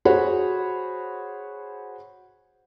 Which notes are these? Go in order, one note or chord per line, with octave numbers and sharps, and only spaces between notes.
F#4 G#4 C5 C#5 F#5 B5